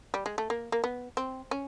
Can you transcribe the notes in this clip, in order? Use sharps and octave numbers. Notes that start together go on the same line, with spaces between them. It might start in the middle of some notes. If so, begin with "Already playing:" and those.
G3
G#3
A3
A#3
A#3
B3
C4
C#4